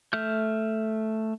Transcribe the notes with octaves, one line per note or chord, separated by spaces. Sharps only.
A3 E5 F6 G6